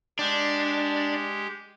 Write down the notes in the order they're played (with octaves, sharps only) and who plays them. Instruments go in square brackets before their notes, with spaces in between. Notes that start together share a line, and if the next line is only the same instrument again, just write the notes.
[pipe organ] G#3 G4 [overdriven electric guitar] D4